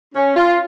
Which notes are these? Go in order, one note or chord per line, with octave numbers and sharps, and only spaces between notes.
C#4
F4